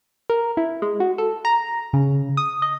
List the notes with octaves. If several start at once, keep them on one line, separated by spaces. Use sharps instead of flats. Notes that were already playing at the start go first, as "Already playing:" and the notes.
A#4
E4
G#3
F#4
A4
A#5
C#3
D#6
D#5